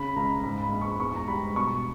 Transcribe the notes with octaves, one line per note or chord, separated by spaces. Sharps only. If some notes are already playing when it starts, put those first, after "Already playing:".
Already playing: C#3 B5
C#2 A#5
G#2 B5
B5
A#1
C#6
E2 C#6
A#5
G3 B5
B2 C#6